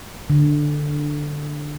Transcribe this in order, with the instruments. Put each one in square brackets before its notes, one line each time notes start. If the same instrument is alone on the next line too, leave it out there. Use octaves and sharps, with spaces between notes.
[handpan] D3